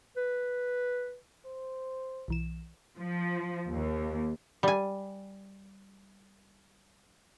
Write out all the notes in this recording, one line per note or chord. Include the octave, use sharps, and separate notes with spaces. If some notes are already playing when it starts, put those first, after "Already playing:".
B4
C5
B1 E3 E7
F3
D#2
G3 G#5